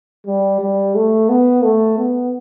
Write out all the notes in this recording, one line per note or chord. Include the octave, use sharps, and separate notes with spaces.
G3
G3
A3
B3
A3
B3